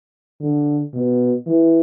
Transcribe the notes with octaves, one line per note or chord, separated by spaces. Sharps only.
D3
B2
E3